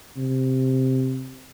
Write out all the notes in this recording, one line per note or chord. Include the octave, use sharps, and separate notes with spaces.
C3